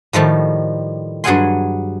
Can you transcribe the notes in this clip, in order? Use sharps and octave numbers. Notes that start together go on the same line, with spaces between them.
A2 D#3 F3 G3
G2 F#3 G#4 F#5 G#5 C6